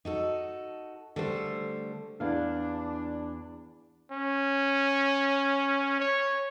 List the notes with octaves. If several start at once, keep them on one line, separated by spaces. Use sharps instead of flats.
D#4 F#4 A4
D3 G3 A3 A4 C5
E2 D4 F5
C#4
C#5